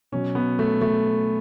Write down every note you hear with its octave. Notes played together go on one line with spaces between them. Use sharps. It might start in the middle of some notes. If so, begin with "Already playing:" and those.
B2 F#3 C#4
B3
A3
A3